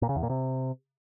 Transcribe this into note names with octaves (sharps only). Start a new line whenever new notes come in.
A#2
C#3
E2
A#2
C3